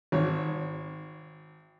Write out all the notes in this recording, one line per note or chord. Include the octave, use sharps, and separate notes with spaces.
G#1 C#5